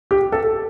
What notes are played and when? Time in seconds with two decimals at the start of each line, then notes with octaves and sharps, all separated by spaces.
0.11 G4
0.32 A4